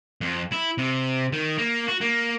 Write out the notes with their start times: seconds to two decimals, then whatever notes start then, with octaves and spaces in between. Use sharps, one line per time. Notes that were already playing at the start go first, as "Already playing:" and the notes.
0.21 F2
0.52 E4
0.78 C3
1.33 D#3
1.58 A#3
1.88 F#4
2.01 A#3